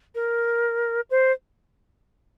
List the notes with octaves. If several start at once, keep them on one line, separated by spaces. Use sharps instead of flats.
A#4
C5